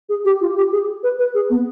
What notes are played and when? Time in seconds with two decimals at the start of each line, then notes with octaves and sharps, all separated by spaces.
0.09 G#4
0.25 G4
0.41 F4
0.56 G4
0.72 G#4
1.03 B4
1.19 B4
1.34 G#4
1.50 B3